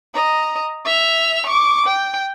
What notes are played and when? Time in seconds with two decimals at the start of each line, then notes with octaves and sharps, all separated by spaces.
0.15 D#5 A#5
0.85 E5 F7
1.46 C#6 D6
1.86 G5